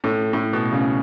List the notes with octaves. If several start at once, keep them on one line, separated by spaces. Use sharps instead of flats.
A2
A2
B2
C#3